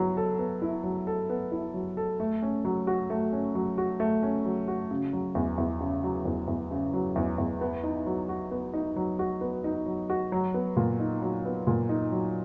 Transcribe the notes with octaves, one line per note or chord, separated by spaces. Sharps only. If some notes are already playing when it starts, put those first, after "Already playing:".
Already playing: F#3 B3 E4
A4
B3
E4
F#3
A4
B3
E4
F#3
A4
A3
C#4
F#3
F#4
A3
C#4
F#3
F#4
A3
C#4
F#3
F#4
C#3
F#3
E2
E2
C#3
F#3
E2
E2
C#3
F#3
E2
E2
B3
D#4
F#3
F#4
B3
D#4
F#3
F#4
B3
D#4
F#3
F#4
F#3
B3
A#2
D#4
F#3
B3
A#2
D#4
F#3